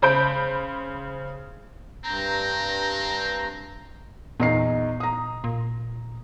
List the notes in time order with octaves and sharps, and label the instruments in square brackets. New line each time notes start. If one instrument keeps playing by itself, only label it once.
[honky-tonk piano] C#3 C5 B5 G6 D7
[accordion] G2 A#5 G6 [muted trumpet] C4
[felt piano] E2 D#4 C7 [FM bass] A#2
[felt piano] A#5 D#6
[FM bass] A#2